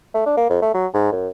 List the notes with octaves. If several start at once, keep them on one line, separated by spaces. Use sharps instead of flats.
A3
D4
A#3
F2
A3
F#3
G#2
F#2